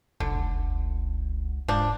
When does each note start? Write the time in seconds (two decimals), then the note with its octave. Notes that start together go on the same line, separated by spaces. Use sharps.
0.20 F1 B1 D3
0.35 C#2
1.68 E1 G#2 F3 D4